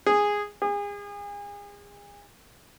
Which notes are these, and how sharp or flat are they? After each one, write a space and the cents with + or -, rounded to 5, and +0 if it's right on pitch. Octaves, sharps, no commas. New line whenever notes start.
G#4 -10
G#4 -35